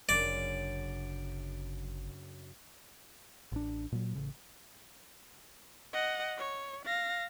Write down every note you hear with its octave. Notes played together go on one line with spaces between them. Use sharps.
G1 F#2 C#3 D4 D5
A1 D4
A#2 F#3
A1 C#3
D#5 F#5
C#5
F5 A#6